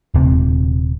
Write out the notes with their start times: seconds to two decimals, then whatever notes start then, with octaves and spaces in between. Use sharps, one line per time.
0.14 D#1 C3